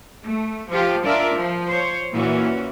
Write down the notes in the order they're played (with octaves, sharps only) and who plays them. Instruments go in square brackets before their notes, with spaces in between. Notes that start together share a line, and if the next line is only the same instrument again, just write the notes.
[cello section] A3
F3 F4 G4
D4 F4 A#4 D5 E5
F3
C5 C#5
A#2 E3 C#4 F#4